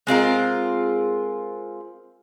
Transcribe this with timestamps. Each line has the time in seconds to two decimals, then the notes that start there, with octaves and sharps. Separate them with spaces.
0.07 G#3 C4 F4 A#4